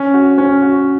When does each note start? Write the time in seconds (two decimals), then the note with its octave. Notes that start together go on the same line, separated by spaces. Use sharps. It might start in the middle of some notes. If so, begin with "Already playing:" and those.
Already playing: C#4
0.14 F#4
0.38 C#4
0.62 F#4